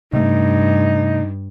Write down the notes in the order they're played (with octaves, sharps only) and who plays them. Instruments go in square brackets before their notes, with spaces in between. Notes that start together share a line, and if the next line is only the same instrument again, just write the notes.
[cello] G2 [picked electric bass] C3 A3 [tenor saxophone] D#4